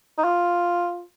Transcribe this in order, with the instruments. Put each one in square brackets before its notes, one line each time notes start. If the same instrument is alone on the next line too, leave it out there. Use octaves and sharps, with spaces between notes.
[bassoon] D#4
F4